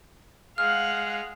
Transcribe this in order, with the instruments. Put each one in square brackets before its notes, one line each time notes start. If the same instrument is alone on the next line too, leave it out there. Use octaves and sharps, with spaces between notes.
[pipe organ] G#3 [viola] F5 F#5 [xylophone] F6